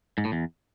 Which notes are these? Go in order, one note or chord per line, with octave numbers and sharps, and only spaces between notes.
G#2
A2
E2